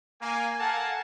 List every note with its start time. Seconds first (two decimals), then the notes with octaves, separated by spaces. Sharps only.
0.22 A#3 G#5
0.60 A4 A#4 F5 F#5 G#5 A5